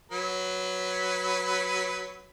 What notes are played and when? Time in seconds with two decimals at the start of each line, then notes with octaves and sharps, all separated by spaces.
0.11 F#3 B4